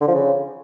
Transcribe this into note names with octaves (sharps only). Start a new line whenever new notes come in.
D3
F3
C#3